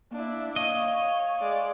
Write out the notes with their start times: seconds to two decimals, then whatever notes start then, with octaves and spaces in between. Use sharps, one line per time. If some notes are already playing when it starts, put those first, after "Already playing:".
0.11 A#3 D4 E4
0.56 C#5 D#5 F5
1.41 G#3 D5